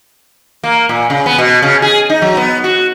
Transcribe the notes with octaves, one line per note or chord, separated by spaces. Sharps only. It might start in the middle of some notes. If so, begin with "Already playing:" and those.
A#3
A#2
C#3
B3
B2
C#3
G#4
D#4
F#3
B3
F#4